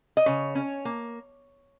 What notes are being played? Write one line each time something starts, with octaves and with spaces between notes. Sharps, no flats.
D#5
C#3 C#5
C#4
A#3